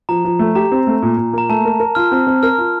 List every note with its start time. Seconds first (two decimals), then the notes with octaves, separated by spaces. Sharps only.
0.09 F3 A#5
0.25 F3
0.39 A3
0.55 G4 A#5
0.72 C4
0.87 A3
1.02 A#2
1.17 A#2
1.33 A#3 A#5
1.49 A3 A5
1.65 A#4
1.80 A#4
1.95 F4 F6
2.12 C4
2.27 C4
2.43 A#4 F6
2.58 F4